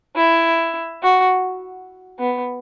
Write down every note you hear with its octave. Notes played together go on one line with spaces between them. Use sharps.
E4
F#4
B3